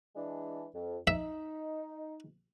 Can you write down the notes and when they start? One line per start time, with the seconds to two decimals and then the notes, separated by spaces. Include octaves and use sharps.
0.16 E3 G#3 D4
0.75 F2
1.07 D#4 E5